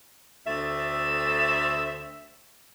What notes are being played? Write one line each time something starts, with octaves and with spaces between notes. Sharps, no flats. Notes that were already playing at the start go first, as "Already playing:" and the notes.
D2 A3 C4 E5